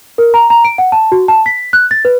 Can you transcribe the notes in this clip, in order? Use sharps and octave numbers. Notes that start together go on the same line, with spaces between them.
A#4
A#5
A#5
D7
F#5
A5
F#4
A5
B6
F#6
A6
B4